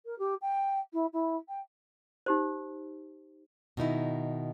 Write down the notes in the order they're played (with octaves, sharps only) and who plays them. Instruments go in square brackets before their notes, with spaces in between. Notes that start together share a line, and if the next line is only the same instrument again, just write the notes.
[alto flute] A#4
G4
G5
E4
E4
G5
[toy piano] D#4 G4 C5
[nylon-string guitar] B2 D#3 D#4 E4